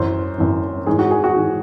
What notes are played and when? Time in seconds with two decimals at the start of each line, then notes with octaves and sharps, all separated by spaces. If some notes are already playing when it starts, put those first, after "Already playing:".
Already playing: F#2 E3 C5
0.38 F#2 E3
0.86 G#2 E3 G#4
0.99 F#4
1.11 G#4
1.24 F#4
1.35 G#2 E3